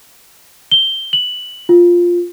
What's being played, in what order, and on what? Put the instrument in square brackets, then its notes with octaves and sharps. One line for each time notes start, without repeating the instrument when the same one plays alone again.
[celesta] G7
F#7
F4